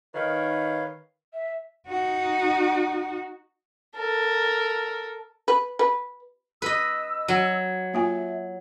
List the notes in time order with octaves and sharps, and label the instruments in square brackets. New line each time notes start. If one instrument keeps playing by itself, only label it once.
[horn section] D#3 [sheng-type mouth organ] B4 C#5 F5
[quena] E5
[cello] D#4 F#4
[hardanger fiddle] A4 A#4
[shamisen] B4
B4
[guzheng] B4 D#5 [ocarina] E6
[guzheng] F#3
[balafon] A#3 F4 G#5 [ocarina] E5